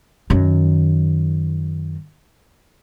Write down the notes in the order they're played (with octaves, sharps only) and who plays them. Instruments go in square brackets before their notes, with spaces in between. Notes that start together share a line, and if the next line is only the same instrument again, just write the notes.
[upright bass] F#2 D#3